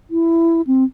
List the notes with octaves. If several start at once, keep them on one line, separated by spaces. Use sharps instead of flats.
E4
C4